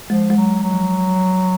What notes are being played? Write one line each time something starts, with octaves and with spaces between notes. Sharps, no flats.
F3 G#3
G#3
F#3
F#3
F3